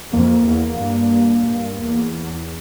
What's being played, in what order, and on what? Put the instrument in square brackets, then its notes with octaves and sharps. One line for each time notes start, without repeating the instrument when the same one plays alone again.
[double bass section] F2 [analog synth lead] A#3
[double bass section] E2
G2
G2
E2